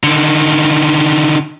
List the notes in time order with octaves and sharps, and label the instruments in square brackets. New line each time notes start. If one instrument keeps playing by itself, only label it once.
[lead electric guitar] D3 D#3